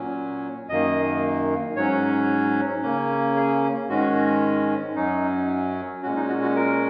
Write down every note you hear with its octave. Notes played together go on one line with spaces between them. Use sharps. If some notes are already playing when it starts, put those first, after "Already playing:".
Already playing: A#2 F#3 C#4
F#2 D#3 A#3 D#5
G#2 F#3 C#4 C#5
C#3 A#3 C#4
G#4
G#2 D#3 G#3 C#4 F#4
F#2 F#3 C#4 D#4
A#2 G#3 C#4 F#4
D#4
F#4
F#4
A#4